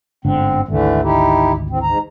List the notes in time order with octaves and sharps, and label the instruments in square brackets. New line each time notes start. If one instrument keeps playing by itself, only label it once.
[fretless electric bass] G1 G#2 D3 [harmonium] C4
[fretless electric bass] G#1 D2 [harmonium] D3 E3 A3
[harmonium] D#4 E4 G4
A2 C4
G#2 A#5